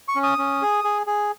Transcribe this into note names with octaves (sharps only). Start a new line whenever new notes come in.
C#6
C#4
D#6
C#4
G#4
G#4
G#4